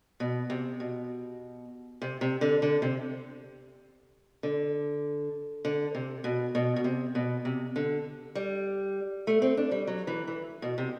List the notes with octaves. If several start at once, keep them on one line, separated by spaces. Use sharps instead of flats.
B2
C3
B2
C3
C3
D3
D3
C3
D3
D3
C3
B2
B2
B2
C3
B2
C3
D3
G3
A3
C4
D4
G3
F#3
E3
E3
B2
C3